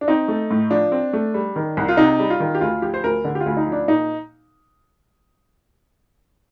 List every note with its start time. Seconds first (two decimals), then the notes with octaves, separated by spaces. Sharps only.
0.01 D4
0.08 C4 D#4
0.28 A3
0.51 A2
0.70 F3 D4
0.92 C4
1.13 A3
1.34 G3
1.56 D#3
1.77 C2
1.88 F4
1.97 C3 D#4
2.19 G3
2.30 F4
2.40 D#3
2.55 G4
2.61 D2 F4
2.82 F3 G4
2.94 C5
3.04 D2 A#4
3.25 D3
3.35 G4
3.40 F4
3.46 D2
3.57 D#4
3.67 F3
3.72 D4
3.88 A#2 D#4